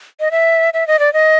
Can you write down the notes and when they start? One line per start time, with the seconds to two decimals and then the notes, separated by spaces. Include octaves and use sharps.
0.20 D#5
0.31 E5
0.74 E5
0.88 D#5
0.99 D5
1.13 D#5